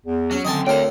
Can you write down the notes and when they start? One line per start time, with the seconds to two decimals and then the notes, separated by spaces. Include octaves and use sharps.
0.06 E2
0.31 F#3 C#4
0.45 F#2 D3 D#3 C4 D#5 G#5 A5
0.67 D2 A#4 C#5 F5 G5